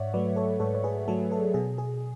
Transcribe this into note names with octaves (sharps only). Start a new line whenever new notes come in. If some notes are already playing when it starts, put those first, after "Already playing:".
Already playing: G#2 C#5 D5 E5 F#5
F#3 A3 B4 D5
A4 C#5
G#2 A4 C#5
C#5
G#4 B4
F#3 A3 A4
A4
B2 G#4
G#4